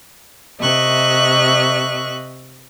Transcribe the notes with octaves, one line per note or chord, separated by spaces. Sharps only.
C3 D#5 E5 C#6 F#6